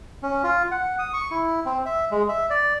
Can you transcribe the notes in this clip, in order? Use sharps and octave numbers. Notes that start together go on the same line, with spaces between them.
C#4
F4
F#5
D#6
C#6
E4
C4
E5
G#3
E5
D5